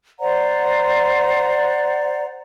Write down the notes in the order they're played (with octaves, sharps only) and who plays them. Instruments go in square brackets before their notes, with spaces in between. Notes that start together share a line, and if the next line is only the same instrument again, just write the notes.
[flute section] C5 D5 F#5 A#5